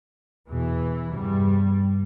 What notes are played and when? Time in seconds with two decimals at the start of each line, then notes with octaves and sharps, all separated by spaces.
0.48 E2 B2 E3
1.13 E2 G2 C3 G3